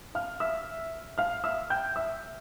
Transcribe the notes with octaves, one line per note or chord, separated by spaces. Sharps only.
F5 F6
E5 E6
F5 F6
E5 E6
G5 G6
E5 E6